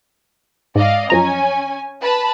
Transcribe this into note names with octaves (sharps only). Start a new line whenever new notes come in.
G#2 D5 D#5 F5
F#2 F3 C#4 G#5 A#5
B4 A5 B5